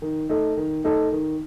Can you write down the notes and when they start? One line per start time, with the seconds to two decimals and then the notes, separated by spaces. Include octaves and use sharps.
0.02 D#3
0.29 A3 D#4 A4
0.57 D#3
0.84 A3 D#4 A4
1.12 D#3